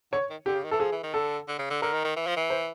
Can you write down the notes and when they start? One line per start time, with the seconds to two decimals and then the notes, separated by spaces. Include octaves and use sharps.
0.12 D3 C#5
0.30 D#3
0.46 D3 G4
0.55 C#3
0.64 D#3
0.71 E3 A4
0.80 F3 G#4
0.92 E3
1.04 D#3
1.14 D3 A4
1.48 D3
1.59 C#3
1.70 D3
1.82 D3 A#4
1.93 D#3
2.04 D#3
2.16 E3
2.27 F3
2.36 E3
2.50 C5